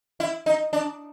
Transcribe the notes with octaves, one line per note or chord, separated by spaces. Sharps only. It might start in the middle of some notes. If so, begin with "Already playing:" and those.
E4
D#4
D4